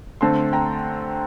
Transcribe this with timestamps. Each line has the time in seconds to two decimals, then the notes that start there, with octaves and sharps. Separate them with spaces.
0.21 D3 A3 C4 A5 C6
0.53 G5 A#5